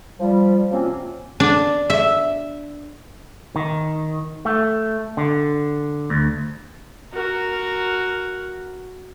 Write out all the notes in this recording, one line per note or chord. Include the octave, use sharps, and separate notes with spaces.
F3 G3
C3 F3 F#3 A#3 C4 C#4
D4
E5
D#3
A3
D3
D2
F#4 A#4